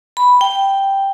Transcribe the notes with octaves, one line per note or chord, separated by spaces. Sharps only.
B5
G5